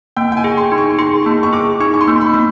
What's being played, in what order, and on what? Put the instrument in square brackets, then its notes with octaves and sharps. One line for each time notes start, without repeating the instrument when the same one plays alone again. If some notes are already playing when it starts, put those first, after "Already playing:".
[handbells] A#3 [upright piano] G5
[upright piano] G5
G#5
[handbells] G#4
[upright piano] C6
[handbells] D#4
[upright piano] C#6
[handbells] G#4 [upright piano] C6
[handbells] A#3 [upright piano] A5
[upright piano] C#6
[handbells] G#4 [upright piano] D6
[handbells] D#4 [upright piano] C#6
[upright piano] C#6
C6
[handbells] A#3
[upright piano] B5
[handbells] A#3